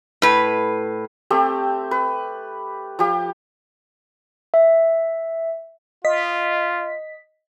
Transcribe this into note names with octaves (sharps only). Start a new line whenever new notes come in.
A2 B4
A3 C4 G4
B4
F3 G4
E5
F4 D#5 B6